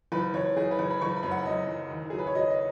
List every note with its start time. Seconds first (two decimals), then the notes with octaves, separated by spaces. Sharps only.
0.12 F#1 B4
0.34 F#1 C#5
0.56 F#1 G#4
0.71 B4
0.79 F#1
0.90 B5
1.01 F#1 C#6
1.16 B5
1.23 F#2
1.31 F#5
1.46 F#2 D#5
1.68 F#1
1.90 D#2
2.10 F#3 G#4
2.18 B4
2.27 C#5
2.35 F#3 D#5
2.50 D#5